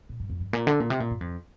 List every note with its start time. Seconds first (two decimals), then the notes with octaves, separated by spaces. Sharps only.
0.09 A#2
0.20 G2
0.30 F2
0.40 G2
0.53 A#2
0.67 D3
0.80 A#2
0.90 C3
1.00 A#2
1.11 G2
1.21 F2